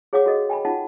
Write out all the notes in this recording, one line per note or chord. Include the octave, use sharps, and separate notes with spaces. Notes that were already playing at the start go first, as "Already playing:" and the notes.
G#4 C#5 F5 F#5 D6
F#4 A4 D#5
G5 G#5 B5
D#4 F4 F#5 A5